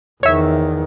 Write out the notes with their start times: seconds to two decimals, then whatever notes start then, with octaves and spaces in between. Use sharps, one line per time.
0.23 E2 D#3 C#5 E5